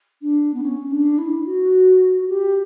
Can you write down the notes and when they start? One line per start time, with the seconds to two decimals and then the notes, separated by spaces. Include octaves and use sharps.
0.22 D4
0.54 B3
0.63 C#4
0.91 D4
1.18 E4
1.46 F#4
2.28 G4